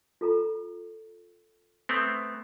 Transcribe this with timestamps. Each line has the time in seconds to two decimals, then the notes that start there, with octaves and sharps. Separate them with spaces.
0.21 F4 A4 A#5
1.89 A3 B3 C4